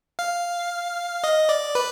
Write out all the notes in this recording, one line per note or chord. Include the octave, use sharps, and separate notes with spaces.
F5
D#5
D5
B4